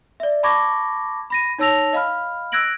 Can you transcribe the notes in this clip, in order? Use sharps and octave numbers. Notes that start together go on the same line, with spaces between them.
D5 E5
A5 B5 C#6 D6 G#6 A#6
B5 A#6 D#7
D#4 C#5 A5 E6 A#6 F7
D#5 F5 B5 F6
E6 F#6 G#6 A#6 D7 F#7